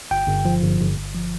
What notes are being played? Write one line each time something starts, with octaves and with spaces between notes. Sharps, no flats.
G1 G5
G1
F3
G1
G1
G1
F3